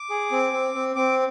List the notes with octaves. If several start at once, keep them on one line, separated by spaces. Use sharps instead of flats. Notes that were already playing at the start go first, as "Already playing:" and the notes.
Already playing: D6
G#4
C4
C4
C4
C4 D6